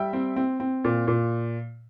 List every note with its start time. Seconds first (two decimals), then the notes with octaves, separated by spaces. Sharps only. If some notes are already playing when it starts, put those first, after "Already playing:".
Already playing: G3 E5 G5
0.13 C4
0.36 C4
0.60 C4
0.84 A#2
1.08 A#2